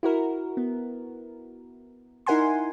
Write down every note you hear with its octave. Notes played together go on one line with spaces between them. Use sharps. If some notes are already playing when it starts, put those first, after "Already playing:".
E4 F#4 A#4
B3
D#4 E4 A#4 F#5 G#5 C6